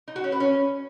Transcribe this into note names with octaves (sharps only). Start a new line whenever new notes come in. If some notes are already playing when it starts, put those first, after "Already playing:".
D#4
F#4
C#4
B4
C#4